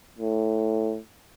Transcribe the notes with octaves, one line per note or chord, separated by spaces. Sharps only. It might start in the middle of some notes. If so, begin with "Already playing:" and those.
A2